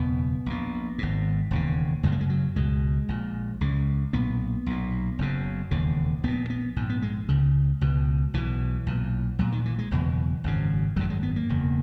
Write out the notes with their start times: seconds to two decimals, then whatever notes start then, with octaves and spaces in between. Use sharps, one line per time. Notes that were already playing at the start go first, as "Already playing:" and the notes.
Already playing: F#1 E2 B2 B3
0.46 A#1 A#2
0.98 G#1 G#2
1.51 E1 D#2 C#3
2.03 F#1 F#2 C#3 G#3
2.12 A#3
2.20 G#3
2.30 F#3
2.56 C#2 B2 G#3
3.09 A#1 A#2
3.61 C#2 C#3
4.13 B1 A#2 B3
4.66 B1 A#2
5.19 F#1 F#2 C#3
5.71 E1 D#2 C#3
6.23 A#1 A#2 B3
6.50 B3
6.76 A#1 G#2
6.90 B3
7.02 G#3
7.29 C#2 C#3
7.81 C#2 B2
8.34 B1 B2 E3
8.87 B1 A#2
9.39 A#1 A#2 F#3
9.52 D#3
9.65 E3
9.78 G#3
9.91 F#1 E2 B2 E3
10.44 G#1 F#2 C#3
10.96 G#1 F#2 C#3 F#3
11.10 G#3
11.23 B3
11.36 A#3
11.49 E1 E2 C#3